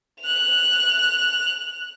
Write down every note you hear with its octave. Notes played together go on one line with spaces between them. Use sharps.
F#6 F7